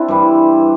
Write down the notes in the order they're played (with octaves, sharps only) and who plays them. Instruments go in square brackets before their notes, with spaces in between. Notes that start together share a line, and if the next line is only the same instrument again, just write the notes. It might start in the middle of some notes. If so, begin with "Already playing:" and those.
Already playing: [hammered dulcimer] C4 D4 E4
G2 E3 G3